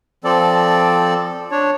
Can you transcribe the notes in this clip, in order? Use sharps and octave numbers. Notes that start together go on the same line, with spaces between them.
F3 C4 A4 D5
D4 C#5